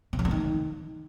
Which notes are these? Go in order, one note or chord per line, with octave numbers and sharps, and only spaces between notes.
C3
D3
G2
D#3